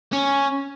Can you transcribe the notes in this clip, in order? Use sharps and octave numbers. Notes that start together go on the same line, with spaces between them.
C#4